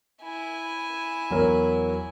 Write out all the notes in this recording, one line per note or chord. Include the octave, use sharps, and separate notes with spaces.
E4 G#5
E2 F#3 A#4